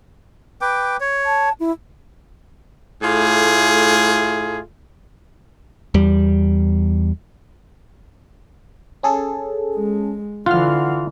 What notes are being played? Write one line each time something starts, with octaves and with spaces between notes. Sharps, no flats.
B4 G5 D6
C#5
A5
E4
A2 A3 F4 G#4
E2 G3
C#4 G#4 A4
G#3
D3 E3 F4 F#5 C6 F6